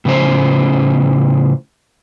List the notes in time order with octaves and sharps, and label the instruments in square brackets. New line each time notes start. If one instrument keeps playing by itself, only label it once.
[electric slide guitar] A2 C#3 F3 C#4 C5